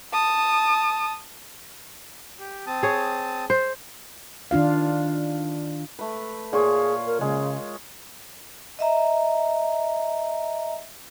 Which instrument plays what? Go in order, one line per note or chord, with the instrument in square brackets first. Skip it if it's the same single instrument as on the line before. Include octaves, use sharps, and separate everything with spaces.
[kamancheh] A5 D#6
[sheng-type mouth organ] G4
C4 A5 D#6
[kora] G#4 C#5
C5
[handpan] D#3 D4 F4 F5
[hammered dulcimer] A3 B4
[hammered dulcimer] A#2 F4 C#5 [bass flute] G#4
[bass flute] A#4
[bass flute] C#3 [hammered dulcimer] G#3
[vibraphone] D#5 E5 A#5